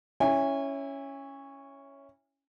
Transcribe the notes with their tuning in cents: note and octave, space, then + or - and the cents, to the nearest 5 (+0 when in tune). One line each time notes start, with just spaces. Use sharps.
C#4 +0 E4 +0 G#5 -30